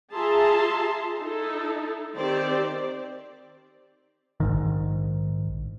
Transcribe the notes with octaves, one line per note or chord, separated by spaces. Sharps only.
F4 G#4 E5 A5 A#5 C6
D#4 E4 A4
D#3 C4 G4 C5 D5
A#1 G#2 D#3